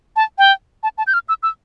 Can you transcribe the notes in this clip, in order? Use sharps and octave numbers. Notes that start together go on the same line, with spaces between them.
A5
G5
A5
A5
G6
F6
E6
E6